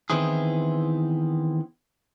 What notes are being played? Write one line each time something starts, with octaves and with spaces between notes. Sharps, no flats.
D#3 E3 B3 C4 E4 G#4